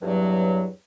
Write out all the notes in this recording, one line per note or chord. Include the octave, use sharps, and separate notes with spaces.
E2 G2 F#3